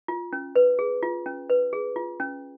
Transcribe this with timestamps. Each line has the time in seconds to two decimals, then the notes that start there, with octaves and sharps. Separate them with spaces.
0.08 F4
0.33 C#4
0.56 B4
0.79 G#4
1.03 F4
1.26 C#4
1.50 B4
1.73 G#4
1.96 F4
2.20 C#4